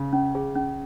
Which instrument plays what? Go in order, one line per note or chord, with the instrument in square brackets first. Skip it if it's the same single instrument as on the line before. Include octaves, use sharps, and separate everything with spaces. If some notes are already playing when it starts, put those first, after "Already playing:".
Already playing: [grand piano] C#3
[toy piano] C#4
G#4
C#4